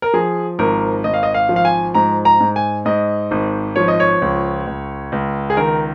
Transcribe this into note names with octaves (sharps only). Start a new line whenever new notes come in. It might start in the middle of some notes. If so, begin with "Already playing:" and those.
A#4
F3 G#4
G#1 A#4
G#1 D#5
F5
D#5
F5
F3
F5
G#5
G#2 A#5
A#5
G#2
G#5
G#2 D#5
G#1
F3 C#5
D#5
C#5
C#2
C#2
C#2
G#4
D#3 A#4